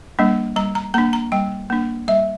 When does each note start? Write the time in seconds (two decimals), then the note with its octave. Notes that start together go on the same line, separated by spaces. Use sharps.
0.19 G3 A#3 D4
0.56 G3 A#5
0.75 A#5
0.94 A#3 D4 A#5
1.13 A#5
1.32 G3 G5
1.70 A#3 D4
2.08 G3 E5